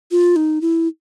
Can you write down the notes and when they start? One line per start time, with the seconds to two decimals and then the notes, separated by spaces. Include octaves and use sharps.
0.11 F4
0.36 D#4
0.61 E4